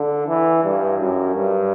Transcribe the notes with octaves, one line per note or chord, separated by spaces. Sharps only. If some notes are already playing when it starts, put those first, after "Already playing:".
Already playing: D3
E3
G2
F#2
G2